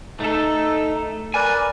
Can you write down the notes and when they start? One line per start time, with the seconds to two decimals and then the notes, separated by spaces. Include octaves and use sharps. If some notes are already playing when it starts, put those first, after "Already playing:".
0.20 A3 D#4 A4
1.34 A#4 B4 D5 G#5